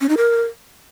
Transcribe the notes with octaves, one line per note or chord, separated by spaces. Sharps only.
C#4
D#4
A#4